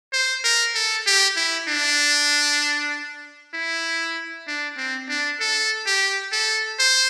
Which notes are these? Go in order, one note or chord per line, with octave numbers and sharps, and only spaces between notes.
C5
A#4
A4
G4
E4
D4
E4
D4
C4
D4
A4
G4
A4
C5